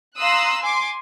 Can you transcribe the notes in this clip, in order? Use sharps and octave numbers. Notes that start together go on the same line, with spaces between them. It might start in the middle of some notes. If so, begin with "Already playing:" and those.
F5 A#5 C6 D#6 E6 F#6
G#5 C6 D6